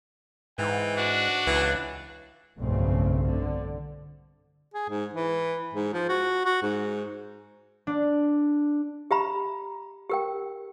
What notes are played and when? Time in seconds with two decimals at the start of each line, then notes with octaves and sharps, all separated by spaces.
0.58 G#2 E3 G5
0.97 D4 F#4
1.47 C#2 E3
2.58 F1 B1 G2 C#3 A3 C4
3.27 D3
4.74 G#4
4.89 G#2
5.14 E3
5.74 G#2
5.94 F3
6.09 F#4
6.46 F#4
6.63 G#2
7.87 D4
9.11 G4 E5 A#5 B5
10.10 G4 A#4 G5